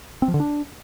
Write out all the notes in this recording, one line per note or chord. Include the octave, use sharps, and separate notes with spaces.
C4
F3
D3
D4